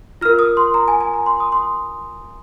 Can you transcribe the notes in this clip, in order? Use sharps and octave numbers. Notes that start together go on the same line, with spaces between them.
F4 A#4 F6
D#6
C6
A#5
G#5
G#5
A#5
C6
D#6
C6